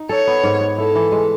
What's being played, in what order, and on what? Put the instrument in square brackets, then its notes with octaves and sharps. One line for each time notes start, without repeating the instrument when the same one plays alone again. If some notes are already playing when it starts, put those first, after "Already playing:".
Already playing: [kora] D#4
[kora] A4 [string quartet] C#5
[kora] B3
G#2
B3
[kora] E4 [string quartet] A4
[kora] E3
G#3